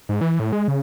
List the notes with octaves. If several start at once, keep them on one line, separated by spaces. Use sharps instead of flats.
G#2
E3
A2
G#3
C#3